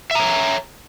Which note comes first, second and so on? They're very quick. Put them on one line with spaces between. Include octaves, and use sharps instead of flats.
E5 A#5 C#5